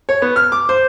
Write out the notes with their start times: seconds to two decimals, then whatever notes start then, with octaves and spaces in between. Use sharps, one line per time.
0.09 C#5
0.22 B3
0.36 F6
0.52 D6
0.69 C5